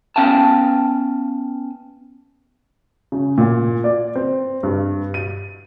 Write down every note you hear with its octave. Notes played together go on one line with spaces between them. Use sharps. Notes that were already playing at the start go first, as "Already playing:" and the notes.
B3 C#4 F5 G5 A5
C#3
A#2
D5
C4
G2
D#7